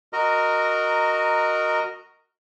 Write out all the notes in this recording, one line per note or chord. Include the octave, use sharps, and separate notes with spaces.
F#4 A#4 D#5 A#5